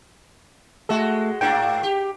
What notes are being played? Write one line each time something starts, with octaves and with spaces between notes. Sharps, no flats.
G#3 A3 F#4 A4
G#2 A#3 D4 G5
G4